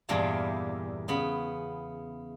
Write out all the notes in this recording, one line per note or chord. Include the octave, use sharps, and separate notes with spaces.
E2 G2 A#2 G3 A#3
C#3 B3 B5